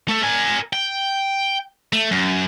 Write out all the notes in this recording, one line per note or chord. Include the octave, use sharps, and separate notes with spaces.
A3 A4
A#4 G#5
G5
A3
F#2